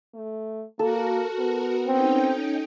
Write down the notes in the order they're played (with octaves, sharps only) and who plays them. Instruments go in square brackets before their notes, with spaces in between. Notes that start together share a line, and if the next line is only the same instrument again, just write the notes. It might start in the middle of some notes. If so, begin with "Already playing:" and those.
[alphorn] A3
[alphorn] A#3 [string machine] F#4 A#4 [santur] A4
[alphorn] B3
[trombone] C4 [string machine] C#4 D#4 G5